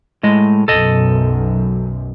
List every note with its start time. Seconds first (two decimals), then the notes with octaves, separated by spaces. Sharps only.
0.23 A2 G#3 D#5
0.68 B1 F#2 A4 D#5